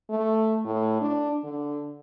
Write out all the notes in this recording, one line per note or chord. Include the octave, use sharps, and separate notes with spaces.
A3
A2
D4
D3